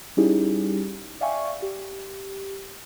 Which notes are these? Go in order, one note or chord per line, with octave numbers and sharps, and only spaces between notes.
G3 C#4 D#4 E4 G4 G#4
D5 E5 F5 G5 G#5 C#6
G4